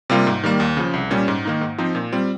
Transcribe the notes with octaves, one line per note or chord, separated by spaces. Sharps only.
C3 G3 A#3 F4
G#2
D#3 G3 A#3
D#2
C#3 F3
C2
A#2 G3 C#4
G#2
D#3 A#3 D#4
G#2
F3 C4 D#4
A#2
G3 C4 F4